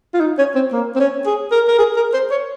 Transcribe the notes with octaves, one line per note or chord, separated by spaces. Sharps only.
F4
D#4
C#4
C4
A#3
C4
C#4
G#4
A#4
A#4
G#4
A#4
C5
C#5